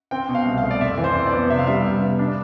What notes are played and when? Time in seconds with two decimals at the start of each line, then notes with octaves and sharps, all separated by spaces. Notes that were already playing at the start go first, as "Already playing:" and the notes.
0.11 C4 G5
0.29 B2
0.35 F5
0.46 C2
0.58 F5
0.63 A3
0.71 D5
0.80 F2 E5
0.97 E3
1.04 C5
1.15 F2
1.27 D5
1.32 B3
1.50 C3 E5
1.59 F5
1.67 G3 E5
1.84 C3
2.01 B3
2.19 D4